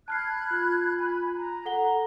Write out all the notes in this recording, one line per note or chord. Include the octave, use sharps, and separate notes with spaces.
A5 B5 F6 F#6 G#6 C7
F4
G#5 B5
A#5
A4 F#5 G7